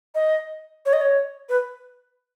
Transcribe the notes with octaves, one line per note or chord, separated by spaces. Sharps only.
D#5
C#5
D#5
C#5
B4